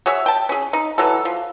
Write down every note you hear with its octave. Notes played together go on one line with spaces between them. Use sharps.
F#4 G#4 C#5 E5
G5 A5
C#4 G#4
D#4
E3 F#3 A4
F3